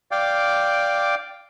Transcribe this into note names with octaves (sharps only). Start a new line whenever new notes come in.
D5 F5 G5 D6